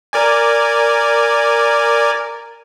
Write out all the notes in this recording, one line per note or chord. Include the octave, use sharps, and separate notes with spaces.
A#4 D5 G#5